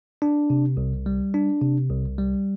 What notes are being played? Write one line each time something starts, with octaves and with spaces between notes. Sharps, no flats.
D4
C3
C2
G3
D4
C3
C2
G3